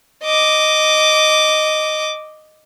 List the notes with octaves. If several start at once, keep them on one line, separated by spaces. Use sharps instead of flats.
D#5 D6